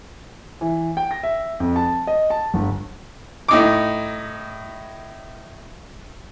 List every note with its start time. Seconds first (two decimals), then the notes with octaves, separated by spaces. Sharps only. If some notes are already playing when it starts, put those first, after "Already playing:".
0.61 E3
0.97 G5
1.11 A#6
1.23 E5
1.60 F2
1.76 A5
2.07 D#5
2.30 A5
2.54 G1
3.48 A2 D#4 D6